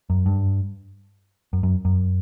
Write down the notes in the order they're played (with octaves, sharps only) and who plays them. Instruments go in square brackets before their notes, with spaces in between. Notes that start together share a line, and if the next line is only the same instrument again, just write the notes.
[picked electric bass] F#2
G2
F#2
F#2
F#2